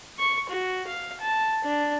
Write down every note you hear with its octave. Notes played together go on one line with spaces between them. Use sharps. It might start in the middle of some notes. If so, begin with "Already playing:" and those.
C#6
F#4
F5
A5
D4